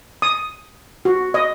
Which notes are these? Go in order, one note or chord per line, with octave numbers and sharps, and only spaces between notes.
D#6
F#4
D#5